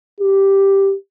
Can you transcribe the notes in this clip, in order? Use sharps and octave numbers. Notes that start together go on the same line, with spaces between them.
G4